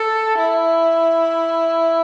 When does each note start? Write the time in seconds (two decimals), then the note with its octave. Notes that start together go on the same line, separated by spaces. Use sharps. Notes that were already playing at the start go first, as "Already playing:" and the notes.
Already playing: A4
0.39 E4